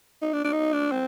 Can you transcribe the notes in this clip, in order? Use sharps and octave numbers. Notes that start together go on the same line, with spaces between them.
D#4
D4
D4
D#4
D4
C4